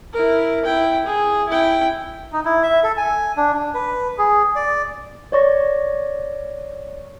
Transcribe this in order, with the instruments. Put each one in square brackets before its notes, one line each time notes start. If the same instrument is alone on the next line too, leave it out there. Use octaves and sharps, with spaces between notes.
[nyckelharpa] E4 A#4
E4 G5
G#4
E4 G5
[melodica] D#4
E4
E5
A4
G#5
D4
D4
B4
G#4
D5
[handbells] C#5 D5 C#6 A#6